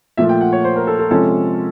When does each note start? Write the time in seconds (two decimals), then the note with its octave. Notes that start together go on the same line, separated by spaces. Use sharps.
0.17 A#2 F3 A3 E5
0.29 G5
0.41 F#5
0.52 C#5
0.64 C5
0.76 A#4
0.87 A4
0.99 A4
1.11 C3 F3 G#3 C#4 A4